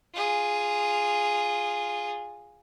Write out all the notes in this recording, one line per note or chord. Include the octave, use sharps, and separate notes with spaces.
F4 G#4